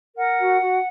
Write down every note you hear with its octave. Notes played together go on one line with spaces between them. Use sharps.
A#4 F#5
F#4
F#4